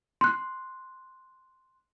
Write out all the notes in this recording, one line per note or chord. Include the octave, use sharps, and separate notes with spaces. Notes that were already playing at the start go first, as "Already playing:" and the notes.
C6 F#6